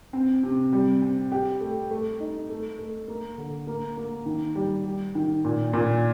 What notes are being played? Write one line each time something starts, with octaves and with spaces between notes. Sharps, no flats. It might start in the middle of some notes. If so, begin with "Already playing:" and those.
C4
C3
G3
C4
G4
A3
A3
D#4
A3
A3
A#3
D3
A#3
A#3
D#3
G3
G3
D#3
A#2
A#2